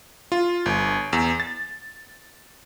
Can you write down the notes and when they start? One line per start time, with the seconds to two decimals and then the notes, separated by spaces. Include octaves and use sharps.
0.32 F4
0.66 G1
1.13 E2
1.40 A6